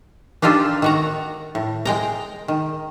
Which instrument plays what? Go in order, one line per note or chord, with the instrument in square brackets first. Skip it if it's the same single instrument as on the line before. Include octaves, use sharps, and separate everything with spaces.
[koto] D4 D#4 F4 G4 A4
D#3 F#4 A#5
A2
G#3 G5 A#5
D#3